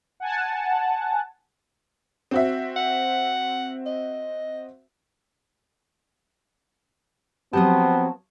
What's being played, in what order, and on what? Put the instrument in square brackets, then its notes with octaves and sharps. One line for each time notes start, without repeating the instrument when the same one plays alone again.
[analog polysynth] F#5 G#5 A5
[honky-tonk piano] C4 F#4 E5
[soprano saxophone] F#5
D#5
[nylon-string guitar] F3 F#3 G4 [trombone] B3 [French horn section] C4 [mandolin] A5 D#6